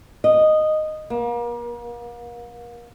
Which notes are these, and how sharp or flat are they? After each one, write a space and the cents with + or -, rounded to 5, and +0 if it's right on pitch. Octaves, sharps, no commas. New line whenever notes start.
D#5 -10
A#3 +40